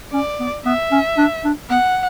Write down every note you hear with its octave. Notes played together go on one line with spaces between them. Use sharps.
C#4 D5
B3
B3 E5
C#4
D4
D4
B3 F#5